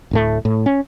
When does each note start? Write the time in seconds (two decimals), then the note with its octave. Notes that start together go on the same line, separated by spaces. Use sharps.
0.11 D1 A2 A3
0.45 A2
0.66 C#4